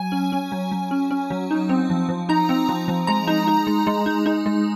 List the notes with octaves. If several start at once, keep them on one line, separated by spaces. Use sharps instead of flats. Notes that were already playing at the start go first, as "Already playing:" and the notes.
Already playing: F#3 G#5
C#4
C#4
F#3
F#3
C#4
C#4
F#3
D#4
C4
F3
F3
D#4 A#5
C4
F3
F3
G#3 A#5
D#4
D#4
G#3
G#3
D#4
D#4
G#3